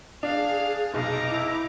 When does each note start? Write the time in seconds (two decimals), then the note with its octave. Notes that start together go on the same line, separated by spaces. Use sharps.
0.23 D4 G#4 F5
0.93 F1 B1 D#4 A#5 D6
1.30 E4